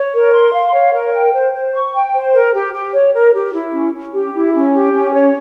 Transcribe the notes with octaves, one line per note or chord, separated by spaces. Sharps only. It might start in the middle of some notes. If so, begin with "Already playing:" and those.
Already playing: C#5
A#4
C6
F5
C#5
A#4
G5
C5
C5
C#6
G5
C5
A#4
G4
G4
C#5
A#4
G4
E4
C#4
C#4
G4
E4
C#4
G4
C#4
C#5